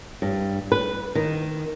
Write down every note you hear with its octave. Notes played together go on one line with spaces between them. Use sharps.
G2
B4
D#3